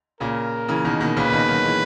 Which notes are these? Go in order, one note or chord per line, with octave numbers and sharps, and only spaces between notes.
A#2 C#3 A#4
C#3 E3
B2 D#3
B2 D#3
A#2 C#3 B4
B2 D#3
D#3 F#3
E3 G#3